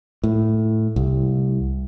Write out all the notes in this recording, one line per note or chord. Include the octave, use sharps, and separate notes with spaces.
A2
C2